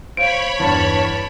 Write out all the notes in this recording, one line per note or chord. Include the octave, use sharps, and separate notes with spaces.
C5 C#5 F5 B5 D7
E2 G2 A5